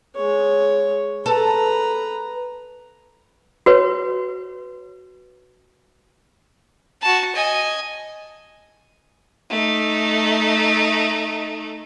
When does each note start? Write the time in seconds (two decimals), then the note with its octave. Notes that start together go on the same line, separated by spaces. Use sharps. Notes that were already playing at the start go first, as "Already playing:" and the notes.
0.15 G#3 C#5
1.26 A4 B4 A#5
3.66 F#4 B4 C#5
7.02 F#4 A5
7.35 D#5 G#5
9.50 A3 D#4